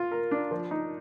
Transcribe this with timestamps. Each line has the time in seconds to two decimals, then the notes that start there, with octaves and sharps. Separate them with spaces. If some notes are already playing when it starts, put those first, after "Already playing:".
Already playing: F4
0.12 A#4
0.31 D4
0.51 F3
0.71 D#4